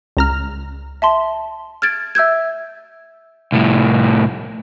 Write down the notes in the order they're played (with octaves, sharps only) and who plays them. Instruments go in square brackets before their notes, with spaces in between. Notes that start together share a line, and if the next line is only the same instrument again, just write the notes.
[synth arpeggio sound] C#2 A#5 F6
[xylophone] E5 A5 C6
F6 G#6 A6 D7
E5 E6 G6 G#6
[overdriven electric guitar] C2 A2